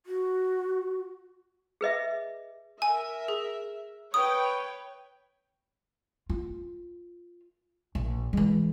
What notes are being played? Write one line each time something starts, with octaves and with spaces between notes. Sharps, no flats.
F#4
G#4 B4 D#5 E5
A#4 E5 G#5
G#4
B4 C#5 G5 D#6
F4
A#1
E3 G#3